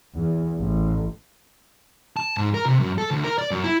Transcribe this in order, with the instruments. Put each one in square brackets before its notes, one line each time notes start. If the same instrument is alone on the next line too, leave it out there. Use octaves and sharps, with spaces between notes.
[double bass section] E2
A1
[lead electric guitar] A5
G#2
A#4
C3
F#2
A4
D2
A#4
D5
F#2
E4